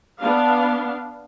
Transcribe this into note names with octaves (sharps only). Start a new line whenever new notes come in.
B3 D4 F5